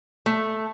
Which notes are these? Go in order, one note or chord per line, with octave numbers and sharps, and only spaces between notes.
A3